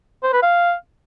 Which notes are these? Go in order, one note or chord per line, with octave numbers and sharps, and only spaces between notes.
C5
B4
F5